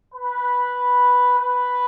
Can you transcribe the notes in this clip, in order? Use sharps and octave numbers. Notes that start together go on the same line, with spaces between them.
B4
B4